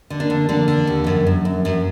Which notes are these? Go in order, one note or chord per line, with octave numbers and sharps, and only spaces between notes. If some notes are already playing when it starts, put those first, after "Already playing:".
D3
A#3 D4
D3
D3 A#3 D4
D3
D#2
F#2
F#2
F#2
F#2